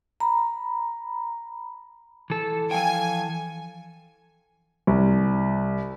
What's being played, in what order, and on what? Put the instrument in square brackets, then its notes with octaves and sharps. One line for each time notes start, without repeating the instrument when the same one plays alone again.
[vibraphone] A#5 B5
[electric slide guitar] E3 A4
[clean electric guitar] F3 F5 G5 [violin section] G#5
[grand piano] C2